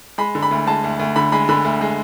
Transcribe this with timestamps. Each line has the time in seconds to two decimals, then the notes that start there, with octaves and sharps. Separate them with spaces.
0.18 G#3 B5
0.35 D3
0.43 B5
0.51 D2
0.67 G#3 A5
0.84 D2
0.99 D2
1.16 D3 B5
1.32 G#3 B5
1.49 D3 B5
1.65 D2
1.81 G#3